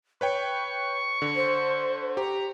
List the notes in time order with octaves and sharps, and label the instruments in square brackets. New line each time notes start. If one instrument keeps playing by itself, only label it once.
[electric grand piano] B4 C#5 G5 [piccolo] C#6
[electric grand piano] D3
[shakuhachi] C5
[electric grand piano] G4 [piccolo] A#5